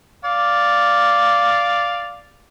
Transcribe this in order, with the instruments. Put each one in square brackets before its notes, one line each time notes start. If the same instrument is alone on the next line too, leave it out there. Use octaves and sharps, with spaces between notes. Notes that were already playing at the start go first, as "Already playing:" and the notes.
[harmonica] D5 F5